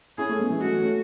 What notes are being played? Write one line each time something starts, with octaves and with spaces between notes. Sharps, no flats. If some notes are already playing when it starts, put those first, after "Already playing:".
C#4 E4 G#4
A3 C#4
G#3 B3
E3 G#3
F#3 A3 F#4
A3 C#4